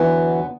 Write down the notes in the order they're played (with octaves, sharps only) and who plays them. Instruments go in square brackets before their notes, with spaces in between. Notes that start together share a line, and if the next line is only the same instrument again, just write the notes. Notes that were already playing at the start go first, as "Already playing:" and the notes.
Already playing: [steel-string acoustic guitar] E2 D3 F#3 B3 F#4 [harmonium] E3